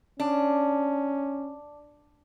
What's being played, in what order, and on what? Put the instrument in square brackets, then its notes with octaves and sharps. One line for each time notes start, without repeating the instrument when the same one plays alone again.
[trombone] C#4 [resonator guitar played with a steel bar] D4